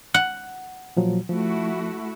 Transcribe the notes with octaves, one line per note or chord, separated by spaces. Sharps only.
F#5
A#2 F3 F#3
F3 A3 E4 F#4